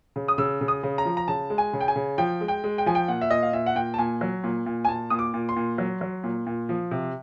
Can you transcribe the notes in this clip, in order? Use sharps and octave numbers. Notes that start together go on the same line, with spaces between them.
C#3
D#6
C#3 E6
C#3
D#6
C#3
A#5
F3
A#5
C#3 A5
G#3
G#5
C#3
G5
G#5
C#3
F3 G5
G#3
G5
G#3
G5
F3 G#5
G5
A#2 F#5
E5
A#2 D#5
F5
A#2 E5
F#5
A#2 G5
A5
A#2 G#5
F#3
A#2
A#2
G#5
A#2 A5
A#2 D#6
D6
A#2
C6
A#2
F#3
F#3
A#2
A#2
F3
C3